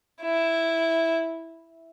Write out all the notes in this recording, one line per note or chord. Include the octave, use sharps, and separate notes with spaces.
E4